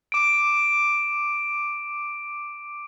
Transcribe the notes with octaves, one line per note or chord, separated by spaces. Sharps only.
D6 D7